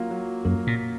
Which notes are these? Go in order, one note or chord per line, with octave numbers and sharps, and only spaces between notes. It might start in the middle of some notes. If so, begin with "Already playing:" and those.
Already playing: F#3 A#3 F4
F#3
F#2 A#3
A#2